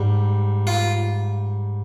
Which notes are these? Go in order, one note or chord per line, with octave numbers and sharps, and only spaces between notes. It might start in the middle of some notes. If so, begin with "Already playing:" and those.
Already playing: G#2 G3
F4